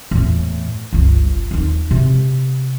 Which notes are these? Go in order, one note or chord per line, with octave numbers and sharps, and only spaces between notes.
E2 A2
G1 C#2
D#2 D#4
C3